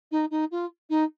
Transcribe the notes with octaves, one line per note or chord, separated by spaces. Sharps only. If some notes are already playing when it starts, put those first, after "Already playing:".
D#4
D#4
F4
D#4